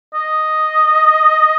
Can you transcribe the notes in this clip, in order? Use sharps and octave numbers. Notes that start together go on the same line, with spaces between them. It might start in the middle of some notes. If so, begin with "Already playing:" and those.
D#5